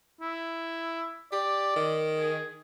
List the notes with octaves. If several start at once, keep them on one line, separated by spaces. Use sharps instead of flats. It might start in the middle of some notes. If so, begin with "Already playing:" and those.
E4
G4 D5
D#3
G#4